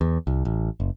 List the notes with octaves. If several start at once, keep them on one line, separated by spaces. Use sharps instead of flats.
E2
C2
A1
F#1